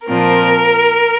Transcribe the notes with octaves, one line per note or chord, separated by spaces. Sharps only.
A#2 F3 C4 A#4